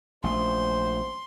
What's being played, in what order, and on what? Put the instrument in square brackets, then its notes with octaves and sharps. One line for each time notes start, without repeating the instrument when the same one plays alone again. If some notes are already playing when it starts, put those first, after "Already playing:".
[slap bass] A#1 A3 [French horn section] F#2 C5 [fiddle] C6